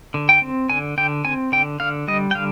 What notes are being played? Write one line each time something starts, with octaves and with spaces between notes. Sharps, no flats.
D3
G5
C4
D3 G#5
D3 G5
C4 G#5
D3 G5
D3 F5
G3 D#5
G5
D3 F5